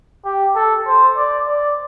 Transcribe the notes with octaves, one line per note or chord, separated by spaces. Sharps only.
G4
A4
C5
D5
D5